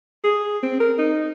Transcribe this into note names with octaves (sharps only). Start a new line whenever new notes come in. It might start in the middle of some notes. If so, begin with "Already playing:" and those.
G#4
C4
A#4
D#4